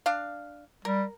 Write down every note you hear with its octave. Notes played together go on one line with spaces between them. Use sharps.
D4 F5
G3 A#4